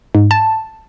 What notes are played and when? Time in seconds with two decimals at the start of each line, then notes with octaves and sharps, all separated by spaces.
0.15 G#2
0.31 A5